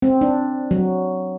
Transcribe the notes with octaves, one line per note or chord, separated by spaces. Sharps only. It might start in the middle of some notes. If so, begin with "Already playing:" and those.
C4
D4
F#3